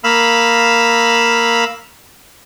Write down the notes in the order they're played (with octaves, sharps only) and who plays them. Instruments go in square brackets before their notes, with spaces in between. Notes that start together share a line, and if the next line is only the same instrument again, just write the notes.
[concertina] A#3 F5 B5 E6